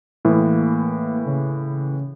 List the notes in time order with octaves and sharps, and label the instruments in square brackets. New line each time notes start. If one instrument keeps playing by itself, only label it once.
[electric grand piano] A2 E3 [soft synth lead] A#3
[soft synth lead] C#3